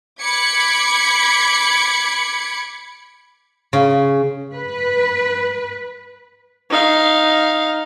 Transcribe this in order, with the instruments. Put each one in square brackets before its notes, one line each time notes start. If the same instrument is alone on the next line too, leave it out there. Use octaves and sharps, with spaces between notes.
[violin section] B5 D6 G#6 B6 C#7
[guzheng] C#3
[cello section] B4
[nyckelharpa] D#4 F5